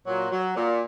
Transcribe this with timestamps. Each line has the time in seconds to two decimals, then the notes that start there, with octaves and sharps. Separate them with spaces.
0.07 A#2 F#3
0.31 F#3
0.56 A#2